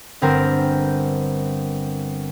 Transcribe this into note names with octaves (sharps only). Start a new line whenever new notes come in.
G1 C4 A#4